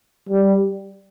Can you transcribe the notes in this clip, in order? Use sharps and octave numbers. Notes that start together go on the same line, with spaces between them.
G3